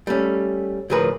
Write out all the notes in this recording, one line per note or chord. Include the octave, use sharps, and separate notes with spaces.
G3 A3 C#4
D2 A2 F3 G#4 A#4 B4